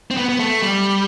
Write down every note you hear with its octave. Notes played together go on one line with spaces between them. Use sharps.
C4
B3
B3
A3
G3